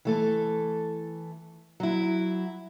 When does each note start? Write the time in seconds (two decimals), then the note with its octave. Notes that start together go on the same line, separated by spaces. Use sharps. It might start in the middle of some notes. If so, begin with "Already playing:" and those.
0.05 E3 A3 A4
1.80 F#3 E4